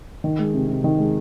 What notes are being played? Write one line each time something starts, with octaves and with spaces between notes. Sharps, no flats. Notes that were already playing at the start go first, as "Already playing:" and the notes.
D#3
G#3
C3
C3
D#3
G#3